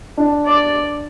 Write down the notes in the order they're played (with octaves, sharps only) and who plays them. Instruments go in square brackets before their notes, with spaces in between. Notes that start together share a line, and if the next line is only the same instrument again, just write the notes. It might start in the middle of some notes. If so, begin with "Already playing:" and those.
[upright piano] D4
[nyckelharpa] D5